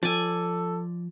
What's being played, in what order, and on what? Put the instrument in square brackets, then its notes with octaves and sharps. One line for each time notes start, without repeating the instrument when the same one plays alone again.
[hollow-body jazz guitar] F3 [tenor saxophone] A4 [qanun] D5 G#5